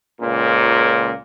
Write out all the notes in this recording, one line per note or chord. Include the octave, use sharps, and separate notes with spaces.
C#2 A#2